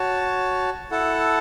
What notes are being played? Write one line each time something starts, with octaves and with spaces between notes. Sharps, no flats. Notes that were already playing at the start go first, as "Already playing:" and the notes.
Already playing: F#4 C#5 A5
E4 A4 F#5 A5